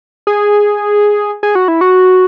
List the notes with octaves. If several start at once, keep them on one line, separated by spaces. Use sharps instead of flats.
G#4
G#4
F#4
E4
F#4